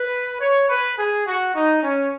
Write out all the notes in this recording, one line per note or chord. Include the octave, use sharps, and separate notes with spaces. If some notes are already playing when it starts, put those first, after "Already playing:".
Already playing: B4
C#5
B4
G#4
F#4
D#4
C#4